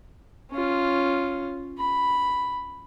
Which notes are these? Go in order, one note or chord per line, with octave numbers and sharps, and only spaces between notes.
C#4 F4
B5